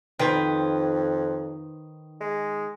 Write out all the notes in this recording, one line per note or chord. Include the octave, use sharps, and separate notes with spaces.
F2 D#3 B4 C5
G#3